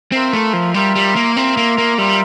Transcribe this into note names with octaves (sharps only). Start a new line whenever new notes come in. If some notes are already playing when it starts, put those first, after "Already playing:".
C4 F4 A#4 E5
A3
F3
G3 F4 A#4 E5
G3
A#3
C4 F4 A#4 E5
A#3
A#3
G3 F4 A#4 E5